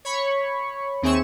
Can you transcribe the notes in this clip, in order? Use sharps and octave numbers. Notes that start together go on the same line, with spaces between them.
C#5 B5 C#6
D#2 C4 G#4 E5 C#6 E7